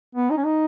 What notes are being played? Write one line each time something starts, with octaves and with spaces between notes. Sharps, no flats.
B3
D#4
C#4
D#4